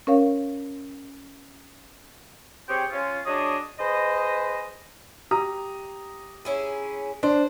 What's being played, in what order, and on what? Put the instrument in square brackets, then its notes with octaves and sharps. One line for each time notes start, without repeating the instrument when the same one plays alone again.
[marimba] C#4 A#4 C#5 F5
[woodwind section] C4 G4 G#4 C5 C#5 G5
C#4 F4
F#3 D4 G#4 C#5 D#5 D#6
G#4 B4 C5 D#5
[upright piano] G4 A#5 D#6
[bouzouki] C#4 E4 G#4
[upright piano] D4 [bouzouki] C5